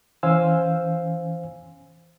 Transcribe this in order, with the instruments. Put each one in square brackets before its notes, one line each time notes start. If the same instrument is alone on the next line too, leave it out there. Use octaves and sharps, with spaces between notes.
[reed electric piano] E3 C#4 C5 F5 G#5 E6